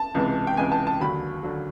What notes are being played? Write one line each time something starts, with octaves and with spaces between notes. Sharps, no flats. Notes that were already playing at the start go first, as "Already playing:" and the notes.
Already playing: A5
C#2 C3 E3 G#3
G5
C#2 C3 E3 G#3 G#5
A5
A5
D#2 D3 F#3 B5
D3 F#3